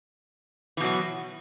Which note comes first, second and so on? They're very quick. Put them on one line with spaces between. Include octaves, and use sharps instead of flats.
E3 B2 F#3